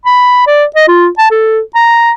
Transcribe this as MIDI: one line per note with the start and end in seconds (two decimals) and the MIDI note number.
0.05 0.44 83
0.47 0.64 74
0.76 0.86 75
0.88 1.08 65
1.18 1.26 81
1.31 1.60 69
1.75 2.12 82